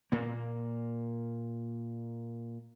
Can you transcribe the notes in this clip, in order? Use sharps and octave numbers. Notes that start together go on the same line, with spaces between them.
A#2 A#3